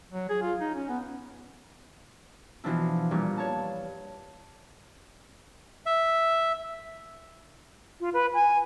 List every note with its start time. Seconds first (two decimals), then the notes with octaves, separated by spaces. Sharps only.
0.12 F#3
0.29 G#4
0.42 F4
0.60 D#4
0.75 C#4
0.89 B3
2.64 B2 E3 F3 D4 E4
3.11 G2 A#2 C#6
3.37 C#5 A5
5.86 E5
8.00 F4
8.13 B4
8.34 G#5